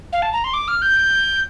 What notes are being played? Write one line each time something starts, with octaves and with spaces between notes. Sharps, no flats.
F5
A5
A#5
C6
D6
F6
G6